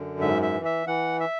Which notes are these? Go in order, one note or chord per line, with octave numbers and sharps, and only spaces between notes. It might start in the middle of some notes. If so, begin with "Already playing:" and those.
Already playing: F#2 D3
G#2 E5
E5
E3
E5
E3 F#5
E5